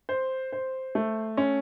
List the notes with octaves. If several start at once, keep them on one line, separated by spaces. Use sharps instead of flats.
C5
C5
A3
C#4